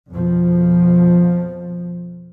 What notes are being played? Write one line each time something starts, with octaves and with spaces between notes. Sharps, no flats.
F2 B2 F3